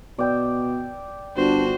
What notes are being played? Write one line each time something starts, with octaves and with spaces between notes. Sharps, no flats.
B2 D5 G5 E6
G1 D4 F#4 C5